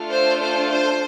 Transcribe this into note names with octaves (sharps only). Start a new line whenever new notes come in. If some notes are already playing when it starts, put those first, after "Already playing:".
Already playing: A3 D4 F4 A4
C5
C5
C5